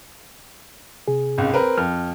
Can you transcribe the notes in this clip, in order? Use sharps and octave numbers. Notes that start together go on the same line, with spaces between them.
C3 G#4
G#1 C#2
C4 A#4 B4
F2 F6